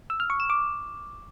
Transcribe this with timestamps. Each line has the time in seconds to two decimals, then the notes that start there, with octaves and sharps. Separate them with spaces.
0.10 E6
0.20 F6
0.30 C#6
0.40 E7
0.50 D6